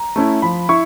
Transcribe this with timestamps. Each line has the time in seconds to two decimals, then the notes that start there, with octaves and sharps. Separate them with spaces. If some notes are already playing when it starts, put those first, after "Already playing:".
Already playing: A#5
0.16 A3 C#4 E4
0.42 F3 B5
0.69 E4 C#6